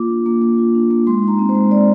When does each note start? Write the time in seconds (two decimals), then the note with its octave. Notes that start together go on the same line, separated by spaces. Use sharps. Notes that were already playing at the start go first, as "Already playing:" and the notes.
Already playing: A#3 F4 D6
0.10 D4
0.26 A#3
0.41 A#3
0.58 F4
0.75 D4
0.91 A#3
1.07 G#3 C6
1.22 D#4
1.28 A#5
1.39 C4
1.49 C5
1.55 G#3
1.71 G#3 D5